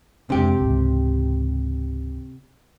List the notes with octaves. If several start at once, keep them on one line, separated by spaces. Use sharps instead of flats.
F2 C3 G#3 D4 G4
C#2 G#2